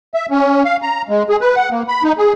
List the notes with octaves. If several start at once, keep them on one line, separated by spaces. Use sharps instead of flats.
E5
C#4
F5
A#5
G#3
G#4
B4
F#5
A#3
B5
D#4
G#4